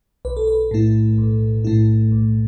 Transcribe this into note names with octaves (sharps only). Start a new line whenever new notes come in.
B1 B4
A4
B4
A2 A3 E4
B1
A2 A3 E4
B1